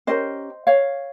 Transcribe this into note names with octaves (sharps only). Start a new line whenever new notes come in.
C#4 G4 A#4 C5 D#5
C#5 F5